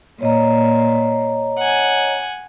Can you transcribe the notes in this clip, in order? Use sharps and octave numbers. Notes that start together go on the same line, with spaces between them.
A#2 C#5 D#5 A#5
F#5 G#5